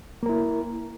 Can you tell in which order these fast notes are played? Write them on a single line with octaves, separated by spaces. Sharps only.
A#3 A#4 E4